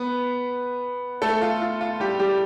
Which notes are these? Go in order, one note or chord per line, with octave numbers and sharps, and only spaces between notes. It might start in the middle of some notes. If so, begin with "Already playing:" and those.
Already playing: B3 B4
A3 A4
F4
F4
F4
G3 G4
G3 G4